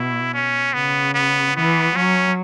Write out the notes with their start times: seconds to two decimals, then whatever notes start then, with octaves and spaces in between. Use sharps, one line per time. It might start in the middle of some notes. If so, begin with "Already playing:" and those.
Already playing: B2 E4
0.33 C#4
0.73 C#3 B3
1.14 B3
1.55 E3 B3
1.96 F#3 C#4